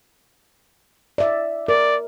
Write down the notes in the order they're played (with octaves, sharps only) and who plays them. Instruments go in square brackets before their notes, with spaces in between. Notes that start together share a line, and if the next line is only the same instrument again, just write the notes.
[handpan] D5 E5
[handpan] A#4 [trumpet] D5